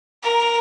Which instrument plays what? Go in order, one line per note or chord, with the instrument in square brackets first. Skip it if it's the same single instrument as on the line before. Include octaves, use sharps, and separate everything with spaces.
[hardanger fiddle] A#4